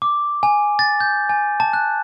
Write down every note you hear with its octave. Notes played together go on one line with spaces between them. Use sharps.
D6
G#5
A6
G6
G#5
A5
F#6